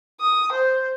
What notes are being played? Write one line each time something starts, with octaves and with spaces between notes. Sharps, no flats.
D#6
C5